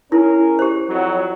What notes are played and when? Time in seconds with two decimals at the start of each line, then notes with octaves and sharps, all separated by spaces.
0.12 C#4 E4 G#4 A#4
0.59 G4 C5
0.89 F2 F#3